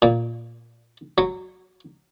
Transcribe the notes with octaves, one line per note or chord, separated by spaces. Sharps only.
A#2
F#3